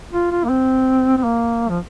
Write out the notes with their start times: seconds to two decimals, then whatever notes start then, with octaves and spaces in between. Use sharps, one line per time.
0.12 F4
0.31 F4
0.44 A#3
0.49 C4
1.17 C4
1.24 A#3
1.69 F3